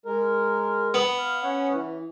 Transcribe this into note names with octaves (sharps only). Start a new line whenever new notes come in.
G#3 A#4
B3
F5
C#4 C#5 F#5
E3